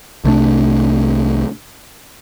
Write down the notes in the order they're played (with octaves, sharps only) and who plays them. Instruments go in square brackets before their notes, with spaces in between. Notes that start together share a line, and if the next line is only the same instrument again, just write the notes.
[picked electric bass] C2 C3 A3 D4